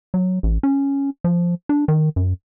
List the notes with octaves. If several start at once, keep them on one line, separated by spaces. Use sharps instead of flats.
F#3
A1
C#4
F3
D4
D#3
F#2